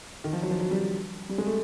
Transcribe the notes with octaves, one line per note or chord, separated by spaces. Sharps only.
D#3
F3
F#3
F3
F#3
G3
G3
G#3
A3